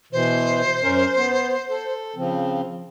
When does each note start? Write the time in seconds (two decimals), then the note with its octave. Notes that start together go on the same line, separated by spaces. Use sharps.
0.13 B2 E3 C5
0.83 F#2 C#4 A#4
1.16 B3
1.70 A4
2.16 C#3 F3 C4